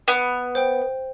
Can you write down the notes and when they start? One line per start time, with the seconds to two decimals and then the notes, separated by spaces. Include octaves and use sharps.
0.08 B3
0.55 C5 G5